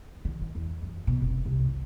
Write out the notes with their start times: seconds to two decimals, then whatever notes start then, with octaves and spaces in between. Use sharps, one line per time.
0.25 D3
0.41 D#3
0.55 E2
0.82 F#2
1.07 B2
1.21 F1
1.45 C2
1.66 F#1